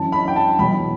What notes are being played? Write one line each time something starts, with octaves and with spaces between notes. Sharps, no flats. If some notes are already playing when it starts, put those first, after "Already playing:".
Already playing: F#2 E3 A5
B5
G5
A5
E2 B2 F#3 B5